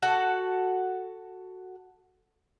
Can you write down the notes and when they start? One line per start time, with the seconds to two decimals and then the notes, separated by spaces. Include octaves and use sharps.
0.02 F#4 A4 F#5